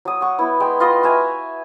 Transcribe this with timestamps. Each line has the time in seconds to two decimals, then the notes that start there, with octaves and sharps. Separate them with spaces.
0.05 F#3 D#6
0.21 F#5 C#6
0.38 B3 E4
0.60 G#3 G5
0.80 F4 B4 D#5
1.03 F#4 E5 G#5 A#5